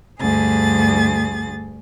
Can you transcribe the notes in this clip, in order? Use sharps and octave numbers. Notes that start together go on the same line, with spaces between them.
D2 G2 G#4 A6